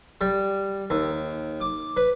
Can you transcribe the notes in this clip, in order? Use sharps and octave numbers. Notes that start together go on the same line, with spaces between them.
G3
D#2
D6
B4